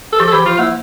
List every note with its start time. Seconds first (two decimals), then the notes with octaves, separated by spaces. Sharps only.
0.13 A4
0.19 F3 G4
0.28 A4
0.33 E3 G4
0.46 F3 F4
0.59 A#3 E4